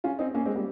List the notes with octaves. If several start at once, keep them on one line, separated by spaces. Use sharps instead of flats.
C#4 F4
C4 D#4
A#3 C#4
G#3 C4
G3 A#3